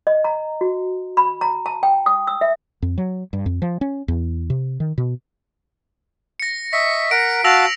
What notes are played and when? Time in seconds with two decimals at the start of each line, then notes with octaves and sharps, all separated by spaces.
0.07 D#5
0.24 A#5
0.61 F#4
1.17 B5
1.41 A#5
1.66 A5
1.83 G5
2.06 D#6
2.27 E6
2.41 E5
2.82 F2
2.98 F#3
3.33 G2
3.46 F2
3.62 F3
3.81 C#4
4.08 E2
4.50 C3
4.80 D#3
4.98 B2
6.40 A#6 C#7
6.73 D#5 E5 C#6 B6
7.11 A#4 F#5 A#5 D7
7.44 F#4 F5 A5 E6 A#6 F7